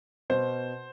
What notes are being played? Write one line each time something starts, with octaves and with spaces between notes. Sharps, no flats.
B2 C5